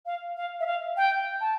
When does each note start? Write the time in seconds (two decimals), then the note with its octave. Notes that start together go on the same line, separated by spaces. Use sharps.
0.06 F5
0.36 F5
0.60 E5
0.66 F5
0.97 G5
1.41 A5